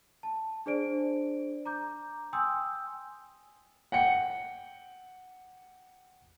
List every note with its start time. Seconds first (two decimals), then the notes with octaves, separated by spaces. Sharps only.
0.23 A5
0.66 D4 G#4 C5 D5 D7
1.65 A#5 D6 G6
2.33 G5 G#5 C6 D#6 E6 G6
3.92 F#5 G5 C#7